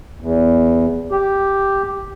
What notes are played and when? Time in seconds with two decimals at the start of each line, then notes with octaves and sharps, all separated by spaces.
0.21 E2
1.12 G4